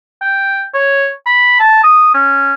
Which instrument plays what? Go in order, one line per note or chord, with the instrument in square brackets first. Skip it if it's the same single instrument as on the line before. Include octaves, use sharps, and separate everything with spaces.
[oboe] G5
C#5
B5
A5
D#6
C#4